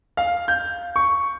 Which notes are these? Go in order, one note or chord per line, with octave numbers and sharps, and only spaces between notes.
F5
G6
C#6